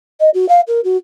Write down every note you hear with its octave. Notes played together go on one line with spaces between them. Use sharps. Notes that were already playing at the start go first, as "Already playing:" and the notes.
D#5
F#4
F5
A#4
F#4